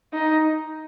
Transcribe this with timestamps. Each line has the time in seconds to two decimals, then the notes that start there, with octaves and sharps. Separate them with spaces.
0.13 D#4